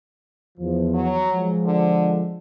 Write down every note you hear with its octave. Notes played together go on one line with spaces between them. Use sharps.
E2 F3
F#3
F3 G#3
D3